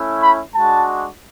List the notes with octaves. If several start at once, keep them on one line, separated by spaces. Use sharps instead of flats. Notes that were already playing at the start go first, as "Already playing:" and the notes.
Already playing: A3 C#4 E4
B5
G#3 D4 F#4 A5